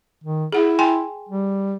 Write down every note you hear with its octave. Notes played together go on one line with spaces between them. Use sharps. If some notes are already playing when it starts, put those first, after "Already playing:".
D#3
E4 G#4 F#5
G5 G#5 C6
G3